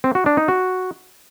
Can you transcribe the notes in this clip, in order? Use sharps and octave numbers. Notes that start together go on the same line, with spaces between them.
C4
F#4
D4
D#4
F#4